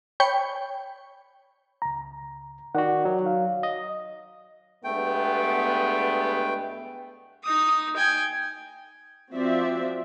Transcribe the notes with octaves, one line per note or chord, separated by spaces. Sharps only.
C#5 G5 B5 G6 C#7
C#2 A#5
D#3 F#4 D5 F#5
F#3
F5
D#5
G2 G#3 A3 B3 G5
D#4 D#6
G5 G#5
F3 C4 F#4 D5 E5